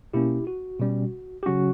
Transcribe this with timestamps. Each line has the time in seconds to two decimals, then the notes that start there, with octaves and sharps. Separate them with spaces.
0.13 B2 A#3 C#4 E4 G4
0.47 F#4
0.80 B2 G3 C#4
1.43 G4
1.46 C#3 F#3 C#4 F#4